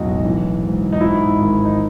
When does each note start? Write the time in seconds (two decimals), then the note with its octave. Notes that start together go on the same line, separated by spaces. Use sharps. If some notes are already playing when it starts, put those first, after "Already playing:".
Already playing: E1 B1 A2 D#4 F#4
0.25 E3
0.63 G#2
0.92 D#4
1.00 G#2 E4
1.38 G#1
1.65 D#4